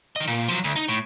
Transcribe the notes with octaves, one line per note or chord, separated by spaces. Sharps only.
D#3 D#5
A#2
F3 F#3
D2
D#4
A2